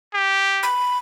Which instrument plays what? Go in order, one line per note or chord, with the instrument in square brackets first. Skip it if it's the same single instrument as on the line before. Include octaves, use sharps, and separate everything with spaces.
[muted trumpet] G4
[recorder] B5